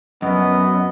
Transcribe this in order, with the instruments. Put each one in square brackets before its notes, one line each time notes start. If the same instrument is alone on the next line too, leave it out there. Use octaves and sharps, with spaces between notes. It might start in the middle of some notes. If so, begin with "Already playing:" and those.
[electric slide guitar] F#2 [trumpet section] B3 D#5